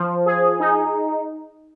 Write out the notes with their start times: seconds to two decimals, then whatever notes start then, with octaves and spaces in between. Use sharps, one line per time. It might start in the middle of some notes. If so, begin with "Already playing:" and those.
Already playing: F3
0.26 G#4
0.60 D#4